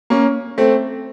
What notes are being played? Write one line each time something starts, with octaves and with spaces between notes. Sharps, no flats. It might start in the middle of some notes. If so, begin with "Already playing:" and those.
A#3 C#4
A3 C4